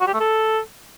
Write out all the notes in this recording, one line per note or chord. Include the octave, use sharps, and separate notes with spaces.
F#4
G4
A3
A4